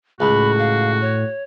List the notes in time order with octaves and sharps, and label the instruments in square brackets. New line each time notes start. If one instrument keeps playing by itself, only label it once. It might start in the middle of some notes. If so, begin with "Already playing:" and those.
[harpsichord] C#2 [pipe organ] A2 [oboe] F#4 [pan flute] B5
[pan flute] F5
C#5